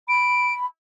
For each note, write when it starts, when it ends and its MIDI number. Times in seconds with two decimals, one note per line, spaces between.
0.08 0.66 83
0.08 0.53 98